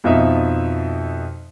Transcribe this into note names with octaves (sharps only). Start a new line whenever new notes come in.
F2 B2 F3 D#4 E5